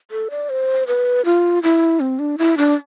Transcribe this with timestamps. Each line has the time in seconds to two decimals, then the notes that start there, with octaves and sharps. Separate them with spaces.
0.11 A4
0.30 D5
0.50 C5
0.87 B4
1.25 F4
1.63 E4
2.00 C4
2.19 D4
2.38 E4
2.58 D4